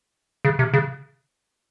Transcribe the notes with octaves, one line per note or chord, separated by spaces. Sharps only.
C#3
C3
C#3